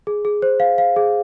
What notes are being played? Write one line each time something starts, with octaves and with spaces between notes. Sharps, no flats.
G#4
G#4
C5
F5
F5
G#4